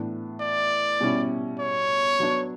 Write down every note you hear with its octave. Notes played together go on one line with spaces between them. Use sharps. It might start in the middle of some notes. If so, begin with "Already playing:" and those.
Already playing: A2 E3 B3 D4
D5
B2 G3 C#4 E4
C#5
F#3 B3 D4